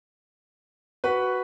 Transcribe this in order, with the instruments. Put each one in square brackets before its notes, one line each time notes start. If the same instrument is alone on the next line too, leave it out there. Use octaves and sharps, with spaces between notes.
[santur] F#4 B5 [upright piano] B4